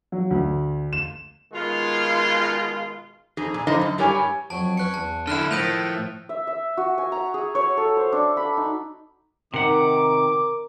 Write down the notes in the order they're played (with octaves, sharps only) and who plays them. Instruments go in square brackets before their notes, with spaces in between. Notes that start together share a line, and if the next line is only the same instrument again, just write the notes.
[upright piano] F#3
D2
E7
[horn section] B2 D#3 G#3 F4
[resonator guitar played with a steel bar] F2 D#4 G#4
A#2
D3 F3 D#4 E4 C5 D#5
F#2
G2 G3 E4 A#4 C#5 G#5
[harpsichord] F2 F#3 C#5 [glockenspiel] A5 D7
[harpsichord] C#4 B4 C#5 [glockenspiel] F#6 C#7
[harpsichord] E2 [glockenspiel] A5
[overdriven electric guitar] D3 E4 [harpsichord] F#5 [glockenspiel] F6 F#6 E7
[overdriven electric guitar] A2 [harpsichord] D#3 F3 [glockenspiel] D#6 G6 F7
[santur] E5
E5
F#4
G#5
A#5
G#4
C#5
A4
C5
D4
B5
D#4
[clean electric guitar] C3 F#5 [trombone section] D#3 [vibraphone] A#4 A#5 [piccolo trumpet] D6